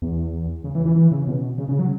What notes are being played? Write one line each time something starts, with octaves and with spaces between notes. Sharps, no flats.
E2
C#3
E3
E3
E3
C#3
B2
C#3
C#3
F#3